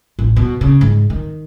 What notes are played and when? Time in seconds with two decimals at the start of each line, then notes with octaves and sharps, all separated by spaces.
0.19 A1
0.36 B2
0.61 C#3
0.81 G#2
1.10 D#3